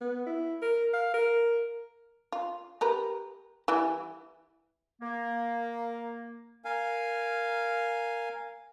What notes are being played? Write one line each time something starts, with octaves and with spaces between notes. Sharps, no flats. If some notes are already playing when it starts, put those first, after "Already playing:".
B3
E4
A#4
F5
A#4
F4
G4 A#4 B4
E3 G3 E4
A#3
A#4 F5 G#5